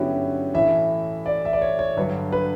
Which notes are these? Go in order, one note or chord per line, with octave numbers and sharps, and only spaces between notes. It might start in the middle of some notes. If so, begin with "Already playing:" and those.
Already playing: G2 D3 F#3 B3 C#4 E4 F#4 G4
A2 E3 E5
D5
E5
D5
C#5
C#5
G2 D3 F#3 B4
B4